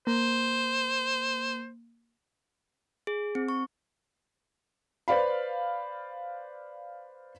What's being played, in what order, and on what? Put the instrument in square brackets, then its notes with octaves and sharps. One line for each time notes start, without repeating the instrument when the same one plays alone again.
[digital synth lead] A#3 [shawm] C5
[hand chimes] G#4
C4
C#6
[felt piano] B4 C5 D5 F5 B5